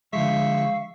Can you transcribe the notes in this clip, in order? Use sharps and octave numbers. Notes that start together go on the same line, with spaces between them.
D3 F3 G#3 E5 F5 C#6